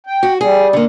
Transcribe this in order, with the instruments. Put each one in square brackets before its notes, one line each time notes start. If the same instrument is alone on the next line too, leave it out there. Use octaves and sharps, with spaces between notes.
[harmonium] G5
[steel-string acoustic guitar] F#4
[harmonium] G3 [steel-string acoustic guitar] G#4
[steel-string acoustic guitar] D3 A#3